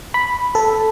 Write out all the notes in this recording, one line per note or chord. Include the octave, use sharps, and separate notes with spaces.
B5
A4